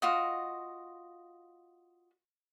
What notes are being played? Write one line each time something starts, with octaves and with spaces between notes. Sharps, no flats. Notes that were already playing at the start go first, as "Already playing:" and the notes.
F4 F#4 D#5